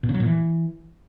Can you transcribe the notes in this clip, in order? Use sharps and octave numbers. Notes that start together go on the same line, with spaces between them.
B2
C#3
F#3
A#2
E3